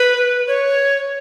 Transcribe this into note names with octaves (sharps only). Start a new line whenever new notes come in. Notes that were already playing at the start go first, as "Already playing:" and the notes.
Already playing: B4
C#5